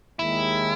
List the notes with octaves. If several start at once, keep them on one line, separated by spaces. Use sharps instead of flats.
D#2 D#3 G#3 E4